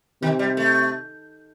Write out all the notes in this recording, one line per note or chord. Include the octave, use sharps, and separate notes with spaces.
C3 D#3
G3
A3